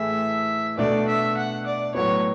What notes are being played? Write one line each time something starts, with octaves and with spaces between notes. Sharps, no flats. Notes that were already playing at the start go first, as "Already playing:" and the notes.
Already playing: A2 E3 A3 E4 G#4 E5
B2 A3 D4 D5
E5
F#5
D5
A2 F#3 B3 C#5